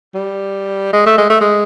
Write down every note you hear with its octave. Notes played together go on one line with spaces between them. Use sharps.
G3
G#3
A3
G#3
A3
G#3